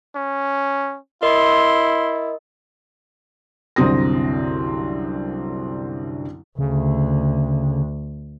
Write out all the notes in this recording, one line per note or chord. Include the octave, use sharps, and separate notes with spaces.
C#4
E4 A#4 D#5 C6
C2 F#2 D3 C4 D#6 A#6
D2 C#3